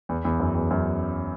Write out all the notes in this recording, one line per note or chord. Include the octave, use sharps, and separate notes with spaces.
E2
E2
F#2
E2
F#2